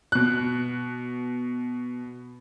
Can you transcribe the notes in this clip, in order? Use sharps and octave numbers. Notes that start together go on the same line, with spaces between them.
B2 F#6